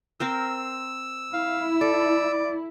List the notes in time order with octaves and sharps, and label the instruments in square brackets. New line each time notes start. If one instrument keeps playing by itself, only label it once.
[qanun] C4 A#4 C5 [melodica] E6
[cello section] E4 [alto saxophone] F5
[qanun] A4 [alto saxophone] D5